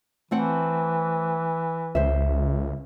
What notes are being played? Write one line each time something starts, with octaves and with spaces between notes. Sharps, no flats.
E3 A3 C4 F#5
C#2 C5 E5